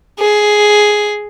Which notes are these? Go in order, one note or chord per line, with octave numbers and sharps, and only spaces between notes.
G#4